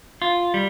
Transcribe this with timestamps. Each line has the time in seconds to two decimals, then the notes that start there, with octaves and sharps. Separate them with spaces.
0.22 F4
0.54 G3